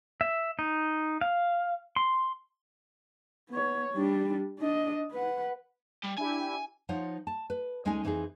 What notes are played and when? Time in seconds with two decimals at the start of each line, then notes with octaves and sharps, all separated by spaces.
0.21 E5
0.59 D#4
1.21 F5
1.96 C6
3.49 B3 C#5
3.94 G3 D4
4.59 D4 D#5
5.11 B4 F#5
6.03 G3
6.18 D4 E4 G4 G#5
6.89 F3 D#4 F4 C#5 F#5
7.27 A5
7.50 B4
7.85 D2 G#3 C#4 D#4 D#5 G#5
8.04 F2 E3 C4 D#4 G#4